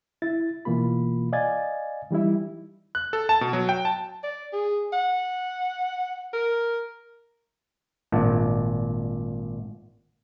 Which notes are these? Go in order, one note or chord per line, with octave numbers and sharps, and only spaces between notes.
E4 A6
B2 E3 A#3 F4 B5
D5 D#5 F5 G#5 G#6 A6
E3 G3 D#4 E4
F#6
A4
A5
B2
F#3
G5
A5
D5
G#4
F#5
A#4
G#1 A#2 D4